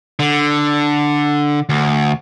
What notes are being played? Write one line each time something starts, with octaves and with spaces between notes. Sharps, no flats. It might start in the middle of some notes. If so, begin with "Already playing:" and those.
D3
D2